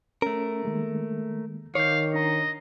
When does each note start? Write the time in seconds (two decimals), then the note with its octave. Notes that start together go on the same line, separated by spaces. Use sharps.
0.22 A3 C#4 A#4
0.63 D#3 G#3 A#3
1.75 D#3 C#5 F5 D6 G6
2.14 D4 D#5 A#5